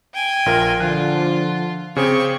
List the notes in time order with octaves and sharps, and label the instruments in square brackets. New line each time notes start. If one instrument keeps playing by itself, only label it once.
[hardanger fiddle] G5 G#5
[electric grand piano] A#1 F4 A#4
[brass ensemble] D3 F3 [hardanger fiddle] F4 [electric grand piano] F#6
[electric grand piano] C#3 G#4 C5 [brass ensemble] C4 [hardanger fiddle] G4 C#6